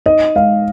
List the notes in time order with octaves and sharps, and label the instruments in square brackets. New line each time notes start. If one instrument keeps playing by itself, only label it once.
[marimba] D#4 [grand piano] D#5
[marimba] G#3 [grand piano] F5